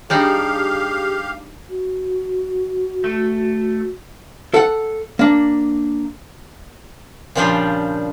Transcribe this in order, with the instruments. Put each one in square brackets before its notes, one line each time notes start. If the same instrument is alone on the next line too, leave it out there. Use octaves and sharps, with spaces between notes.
[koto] G3 D4 D#4 [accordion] G4 F5 [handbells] G#4 [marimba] G5
[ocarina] F#4
[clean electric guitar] A3
[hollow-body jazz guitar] A4 F#5
A#3 D4
[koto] A#2 C#3 F3 G3 D4 F4